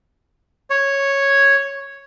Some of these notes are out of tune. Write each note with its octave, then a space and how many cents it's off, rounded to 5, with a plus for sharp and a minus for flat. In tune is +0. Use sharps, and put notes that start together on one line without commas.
C#5 -5